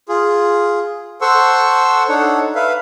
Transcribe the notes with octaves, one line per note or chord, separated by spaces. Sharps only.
F4 G#4
A4 C5 F#5 C6 C#6 E6
D4 D#4 A4 C#5 F#5
B4 E5 F5